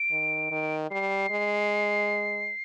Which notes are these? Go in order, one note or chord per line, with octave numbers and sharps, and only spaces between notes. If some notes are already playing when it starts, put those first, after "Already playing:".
Already playing: D7
D#3
D#3
G3 C7
G#3